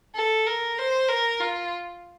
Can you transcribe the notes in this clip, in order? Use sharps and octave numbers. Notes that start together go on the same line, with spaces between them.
A4
A#4
C5
A#4
F4